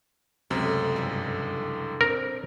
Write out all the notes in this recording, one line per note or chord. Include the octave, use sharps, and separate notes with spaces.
C#2 F#2 C3 A3 C4
G2 D3 E3
C4 D4 A#4 C5